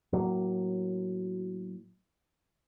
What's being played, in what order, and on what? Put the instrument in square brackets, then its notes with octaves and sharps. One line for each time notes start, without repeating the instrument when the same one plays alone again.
[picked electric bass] A2 F#3 A#3